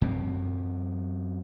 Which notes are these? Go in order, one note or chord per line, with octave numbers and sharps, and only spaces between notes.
F#2 C4